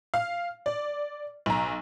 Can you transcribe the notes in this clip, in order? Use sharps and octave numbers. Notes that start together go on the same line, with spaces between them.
F5
D5
B1 A#5